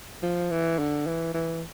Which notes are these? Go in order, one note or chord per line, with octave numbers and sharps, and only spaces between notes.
F3
E3
D3
E3
E3